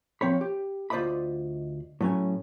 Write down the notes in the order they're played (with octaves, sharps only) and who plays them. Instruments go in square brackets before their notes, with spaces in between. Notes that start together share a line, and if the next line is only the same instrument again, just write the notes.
[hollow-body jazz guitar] F3 C4 C#5 B5
G4
D2 F4 C5 D5 D#5 B5
A2 F#3 C#4 G#5